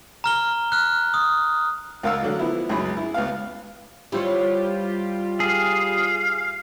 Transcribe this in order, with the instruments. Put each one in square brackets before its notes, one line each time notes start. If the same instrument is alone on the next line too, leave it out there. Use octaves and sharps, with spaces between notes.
[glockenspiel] A#5 F6 G7
F6 F#6
D#6
[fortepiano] C#2 A#4 F5 F#5 E6
D3 F#3
F3 B3 E4
C#2 F#2 F#3 G#4 B5
E4
C#2 B3 F5
[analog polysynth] G3 F4 G4 [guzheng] E4 C5 C#5
[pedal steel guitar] G#4 [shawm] F5